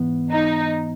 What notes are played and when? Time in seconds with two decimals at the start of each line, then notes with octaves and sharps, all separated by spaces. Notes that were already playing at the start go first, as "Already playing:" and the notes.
Already playing: G#2 E3 B3
0.31 D#4